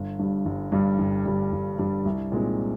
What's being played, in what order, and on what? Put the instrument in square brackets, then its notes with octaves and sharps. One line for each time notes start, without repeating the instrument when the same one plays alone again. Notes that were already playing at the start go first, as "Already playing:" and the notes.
Already playing: [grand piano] G1
G2 G3
G1
G2 G3
G1
G2 G3
G1
G2 G3
C2
A#2 G#3 C4 D#4